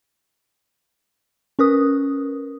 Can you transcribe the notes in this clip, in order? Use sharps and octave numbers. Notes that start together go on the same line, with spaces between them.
C#4 A#4 B4 D#6